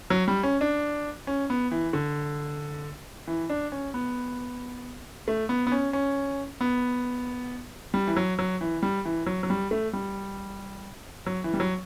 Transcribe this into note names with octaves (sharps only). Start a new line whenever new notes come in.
F#3
G3
C#4
D4
C#4
B3
E3
D3
E3
D4
C#4
B3
A3
B3
B3
C#4
C#4
B3
G3
E3
F#3
F#3
E3
G3
E3
F#3
F#3
G3
A3
G3
F#3
E3
G3
F#3